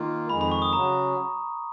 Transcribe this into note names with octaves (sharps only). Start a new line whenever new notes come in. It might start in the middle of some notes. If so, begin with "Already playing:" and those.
Already playing: D#3 A#3 F4
F2 D#3 G#3 B5
B5
C#6
D#6
C#3 F#3 C#4 F#4 A#5